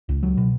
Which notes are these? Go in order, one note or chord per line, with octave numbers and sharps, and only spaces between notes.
C#2
F#3
B2